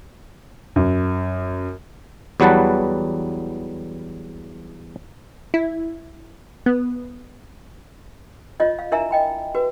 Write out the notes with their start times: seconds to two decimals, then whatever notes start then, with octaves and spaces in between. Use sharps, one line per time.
0.76 F#2
2.40 E2 F#3 G3 B4 F#5 A5
5.54 E4
6.66 B3
8.60 F4 C#5 D#5
8.79 F5
8.92 D4 E4 A#4 E5 G#5 A#5
9.11 D#5 G5 B5
9.55 F#4 B4